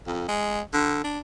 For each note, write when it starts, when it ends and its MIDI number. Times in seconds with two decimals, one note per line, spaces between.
0.06 0.28 41
0.28 0.61 56
0.73 1.00 50
1.04 1.19 62